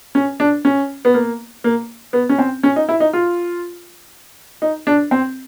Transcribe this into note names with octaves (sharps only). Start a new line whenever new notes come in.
C#4
D4
C#4
B3
A#3
A#3
B3
C#4
C4
C#4
D#4
E4
D#4
F4
D#4
D4
C4